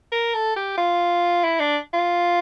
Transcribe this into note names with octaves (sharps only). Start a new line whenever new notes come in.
A#4
A4
G4
F4
E4
D4
F4